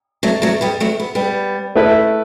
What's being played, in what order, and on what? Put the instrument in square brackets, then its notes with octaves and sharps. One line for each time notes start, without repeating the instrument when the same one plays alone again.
[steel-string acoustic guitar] F#3 A3
F#3 A3
G3 B3
F#3 A3
B3
G3 B3
[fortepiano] A3 E4 B4